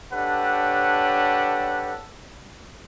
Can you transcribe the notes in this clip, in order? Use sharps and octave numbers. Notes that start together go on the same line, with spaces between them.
D4 G4 A4 B4 C#5 F#5